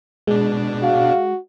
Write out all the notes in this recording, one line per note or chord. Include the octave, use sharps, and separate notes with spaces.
B2 G#3 D4
F#4 F5